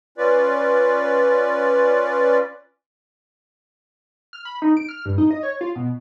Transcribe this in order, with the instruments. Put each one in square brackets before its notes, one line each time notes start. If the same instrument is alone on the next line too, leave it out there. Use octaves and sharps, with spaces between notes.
[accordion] C#4 F4 B4 D5
[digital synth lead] F6
B5
D#4
D7
F6
G2
D#4
D#5
C#5
F4
B2